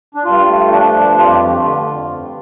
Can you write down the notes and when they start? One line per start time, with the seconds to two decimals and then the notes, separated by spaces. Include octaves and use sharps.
0.15 D4
0.25 G2 F4
0.48 A3
0.71 F3 D4
0.94 G2
1.18 F2 F4
1.30 G4
1.41 A3 G4
1.53 F4
1.64 D3
1.88 F2
2.12 G2